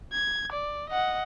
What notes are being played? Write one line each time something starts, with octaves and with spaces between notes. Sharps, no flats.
G#6
D5
D#5 F#5